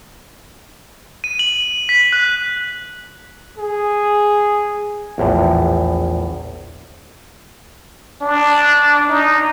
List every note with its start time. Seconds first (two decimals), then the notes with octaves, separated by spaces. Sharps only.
1.24 D#7
1.39 F#7
1.89 B6
2.12 F#6
3.58 G#4
5.18 A#1 E2 A2
8.21 D4
9.09 D#4